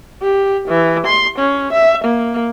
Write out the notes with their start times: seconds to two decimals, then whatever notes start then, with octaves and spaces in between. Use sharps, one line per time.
0.23 G4
0.68 E3
1.07 C6
1.39 C#4
1.73 E5
2.04 A#3